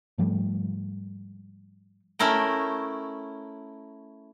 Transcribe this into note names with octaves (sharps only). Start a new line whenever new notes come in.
G#2 F3 G3 A3
A3 C#4 E4 A#4 G5